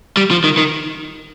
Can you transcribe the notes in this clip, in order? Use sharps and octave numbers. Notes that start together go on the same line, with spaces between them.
G3
F3
D#3
D#3